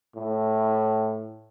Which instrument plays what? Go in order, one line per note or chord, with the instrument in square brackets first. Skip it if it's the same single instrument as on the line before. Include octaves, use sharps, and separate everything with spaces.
[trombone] A2